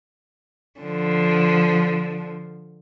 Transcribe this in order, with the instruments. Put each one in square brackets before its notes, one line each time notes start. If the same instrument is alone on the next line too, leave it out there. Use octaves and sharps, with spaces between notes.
[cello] D3 F3